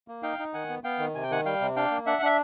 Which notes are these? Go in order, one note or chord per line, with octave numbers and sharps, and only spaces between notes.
A#3
D#4 F5 G5
D#4
D#3 F#5 G#5
B3
B3 F5 G5
D#3
C3 G#5
G5
D#3 F#5 G#5
G3 F5 G5
C3
D4 F5 G5
A#3
D4 E5 F#5
D4 E5